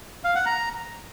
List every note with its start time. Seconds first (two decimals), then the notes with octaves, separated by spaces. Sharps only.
0.24 F5
0.35 F#5
0.46 A#5